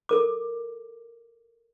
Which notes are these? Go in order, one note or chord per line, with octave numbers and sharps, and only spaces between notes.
A4 A#4 D6